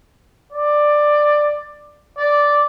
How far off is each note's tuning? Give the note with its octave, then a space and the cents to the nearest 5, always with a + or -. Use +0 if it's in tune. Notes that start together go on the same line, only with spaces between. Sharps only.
D5 +10
D5 -5